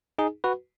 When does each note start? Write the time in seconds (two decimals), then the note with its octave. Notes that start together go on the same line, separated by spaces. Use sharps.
0.19 D#4 G#4
0.44 F#4 B4